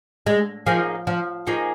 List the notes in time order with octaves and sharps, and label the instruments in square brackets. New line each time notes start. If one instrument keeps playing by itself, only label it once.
[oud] G#3
[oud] F3 [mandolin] A#3 D#4 G#4
[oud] F3
[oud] F3 [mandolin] A#3 D#4 G#4